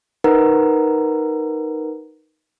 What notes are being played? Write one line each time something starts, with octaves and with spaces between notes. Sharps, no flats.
D#4 A#4 B4 F#5 A#5